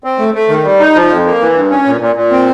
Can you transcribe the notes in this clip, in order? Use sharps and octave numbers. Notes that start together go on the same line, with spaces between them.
C4
A3
A3
D#3
G3
D#4
F3
F2
A#3
E3
G2
C#4
A#2
A#2
A#2
C4